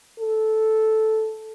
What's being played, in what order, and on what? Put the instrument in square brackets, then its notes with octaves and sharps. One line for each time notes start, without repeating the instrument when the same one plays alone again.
[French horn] A4